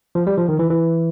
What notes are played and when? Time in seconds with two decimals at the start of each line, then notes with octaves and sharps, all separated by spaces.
0.15 F3
0.27 G3
0.38 F3
0.49 D#3
0.59 E3
0.70 E3